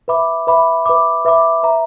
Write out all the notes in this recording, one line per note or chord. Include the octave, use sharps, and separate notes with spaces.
B4 E5 B5 D6
B4 E5 B5 D6
B4 E5 B5 D6
B4 E5 B5 D6
B4 E5 A#5